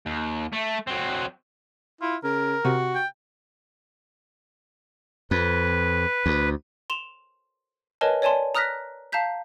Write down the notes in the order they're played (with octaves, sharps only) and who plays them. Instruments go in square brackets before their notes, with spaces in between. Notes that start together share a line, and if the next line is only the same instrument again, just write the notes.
[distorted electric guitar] D#2
A3
F#3 C4
[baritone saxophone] E4 [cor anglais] F4
[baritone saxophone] C#3 [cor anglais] A#4
[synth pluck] C3 [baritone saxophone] F#4
[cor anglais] G5
[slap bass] F2 [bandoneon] B4
[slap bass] D2
[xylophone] C6 E7 F7
A#4 B4 C#5 D#5 G#5 A5
C#5 D5 G#5 A5 C6
A#5 D#6 F6 F#6 A#6 B6
F5 A5 A#5 G6 B6